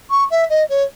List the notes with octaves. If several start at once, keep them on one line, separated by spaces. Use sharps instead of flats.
C#6
E5
D#5
C#5